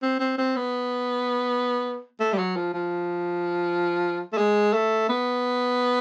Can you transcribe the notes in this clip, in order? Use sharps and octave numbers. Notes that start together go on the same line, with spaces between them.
C4
C4
C4
B3
A3
G3
F#3
F3
F3
A3
G#3
A3
B3